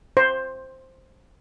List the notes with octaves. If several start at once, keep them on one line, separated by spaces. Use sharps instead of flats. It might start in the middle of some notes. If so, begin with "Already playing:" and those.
C5